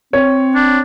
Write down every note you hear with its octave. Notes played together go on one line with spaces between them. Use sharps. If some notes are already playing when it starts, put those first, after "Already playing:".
C4 C#5
D4